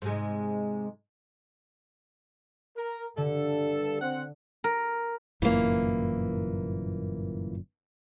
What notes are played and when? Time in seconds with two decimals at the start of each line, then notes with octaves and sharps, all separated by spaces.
0.02 G#2 C3 G#3
2.78 A#4
3.17 G2 D3 A4
4.01 C4 F#5
4.64 A#4
5.42 G1 F#2 A#2 E3 A#3